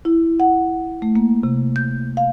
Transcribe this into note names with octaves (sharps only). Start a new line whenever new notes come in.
E4
F#5
A3
A#3
C3
G6
F5